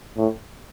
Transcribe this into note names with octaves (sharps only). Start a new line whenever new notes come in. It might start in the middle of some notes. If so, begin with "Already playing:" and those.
A2